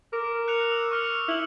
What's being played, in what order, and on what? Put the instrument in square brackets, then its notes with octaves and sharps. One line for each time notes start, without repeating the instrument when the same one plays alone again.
[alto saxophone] A#4 [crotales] D6
[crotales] F#6 C#7 F7
E6
C#6 F6 C#7
[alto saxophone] E4 [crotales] E6 F#7